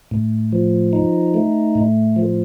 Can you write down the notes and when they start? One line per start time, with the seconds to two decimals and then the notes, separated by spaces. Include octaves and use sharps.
0.11 A2
0.52 F3
0.93 D#4
1.34 A3
1.75 A2
2.16 F3